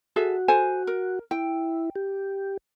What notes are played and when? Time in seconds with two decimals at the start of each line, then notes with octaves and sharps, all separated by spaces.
0.16 F#4 G#4 A4 E5
0.48 A4 C5 G#5
0.87 A#4
1.31 E4 G5
1.96 G4